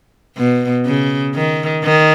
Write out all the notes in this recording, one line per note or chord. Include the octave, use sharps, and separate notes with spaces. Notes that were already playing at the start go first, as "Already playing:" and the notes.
B2
C#3
D#3
D#3